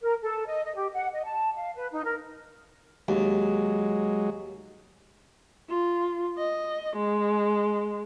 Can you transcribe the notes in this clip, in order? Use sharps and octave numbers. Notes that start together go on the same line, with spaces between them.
A#4
A4
D#5
D#5
G4
F#5
D#5
A5
F5
B4
D#4
A#4
D#2 F#3 G#3
F4
D#5
G#3